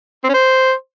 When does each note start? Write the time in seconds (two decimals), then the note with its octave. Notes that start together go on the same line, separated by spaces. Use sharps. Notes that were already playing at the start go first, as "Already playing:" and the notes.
0.24 C4
0.29 C#4
0.34 C5